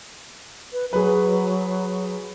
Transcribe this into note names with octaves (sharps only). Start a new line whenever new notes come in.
B4
F#3 G#4 B4